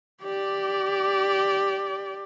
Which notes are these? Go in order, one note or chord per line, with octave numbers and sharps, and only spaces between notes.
G4 D5